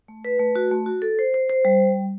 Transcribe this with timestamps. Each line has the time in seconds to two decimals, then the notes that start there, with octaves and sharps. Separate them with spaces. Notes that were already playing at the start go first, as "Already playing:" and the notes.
0.08 A3
0.25 B4
0.39 A3
0.56 F#4
0.71 A3
0.86 F#4
1.02 A4
1.19 C5
1.34 C5
1.50 C5
1.65 G3